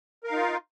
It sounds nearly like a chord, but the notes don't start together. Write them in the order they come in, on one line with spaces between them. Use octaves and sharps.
A#4 F5 D#4 F4